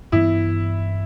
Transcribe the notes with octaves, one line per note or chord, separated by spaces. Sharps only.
G2 E3 B3 E4